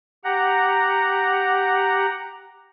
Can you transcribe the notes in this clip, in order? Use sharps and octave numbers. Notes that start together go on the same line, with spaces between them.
G4 F#5 A#5